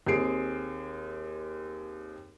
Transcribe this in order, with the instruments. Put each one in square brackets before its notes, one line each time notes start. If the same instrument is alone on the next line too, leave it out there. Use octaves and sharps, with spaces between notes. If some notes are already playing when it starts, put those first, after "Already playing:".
[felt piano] D#2 C4 G#4 C7 D7